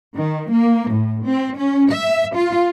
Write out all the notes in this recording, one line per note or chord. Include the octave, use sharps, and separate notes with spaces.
D#3
A#3
A2
C4
C#4
E5
F4